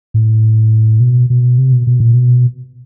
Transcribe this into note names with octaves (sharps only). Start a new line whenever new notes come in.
A2
B2
B2
C3
B2
B2
A#2
B2